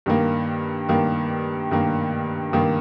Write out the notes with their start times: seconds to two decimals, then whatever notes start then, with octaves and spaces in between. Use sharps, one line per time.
0.06 G2 D#3 A#3
0.89 G2 D#3 A#3
1.71 G2 D#3 A#3
2.53 G2 D#3 A#3